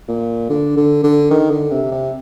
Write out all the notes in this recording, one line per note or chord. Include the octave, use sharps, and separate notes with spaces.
A#2
D3
D3
D3
D#3
D3
C3
C3